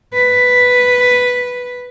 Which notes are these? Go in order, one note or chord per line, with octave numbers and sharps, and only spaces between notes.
B4